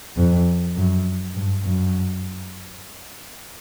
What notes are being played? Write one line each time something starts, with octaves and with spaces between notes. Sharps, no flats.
F2
F#2
G2
F#2